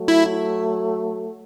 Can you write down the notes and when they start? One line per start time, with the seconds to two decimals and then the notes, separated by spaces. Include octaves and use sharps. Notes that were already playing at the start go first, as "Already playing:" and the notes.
Already playing: F#3 A3
0.08 E4